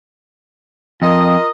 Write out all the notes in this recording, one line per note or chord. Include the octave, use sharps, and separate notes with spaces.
F2 F4 A#4 D#5